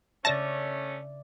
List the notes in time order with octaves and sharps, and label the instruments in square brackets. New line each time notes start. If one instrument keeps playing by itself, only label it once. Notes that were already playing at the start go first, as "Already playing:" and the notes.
[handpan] C#3 D5 E5 [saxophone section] A3 C#4 [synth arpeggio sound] A5 A#6